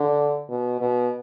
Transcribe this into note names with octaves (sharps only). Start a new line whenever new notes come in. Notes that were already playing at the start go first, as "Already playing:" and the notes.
Already playing: D3
B2
B2